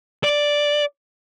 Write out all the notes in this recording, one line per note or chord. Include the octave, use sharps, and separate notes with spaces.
D5